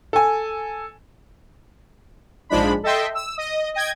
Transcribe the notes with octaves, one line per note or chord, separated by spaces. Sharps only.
A4 G#5
A#1 G#2 F3 G#3 D4 B5
A4 D#5 E5 G5 C6
E6
D#5 D#6
D#5 G5 G#6